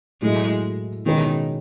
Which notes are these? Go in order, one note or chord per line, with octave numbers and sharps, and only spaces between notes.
A2 F#3 G#3 A3 E4
B2 D#3 G#3 C#4 G#4 B4